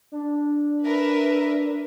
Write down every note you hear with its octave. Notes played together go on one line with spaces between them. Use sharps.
D4
A#4 B4 E5